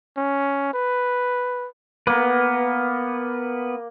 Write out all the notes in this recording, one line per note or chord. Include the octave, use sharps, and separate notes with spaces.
C#4
B4
A#3 B3 B4 D6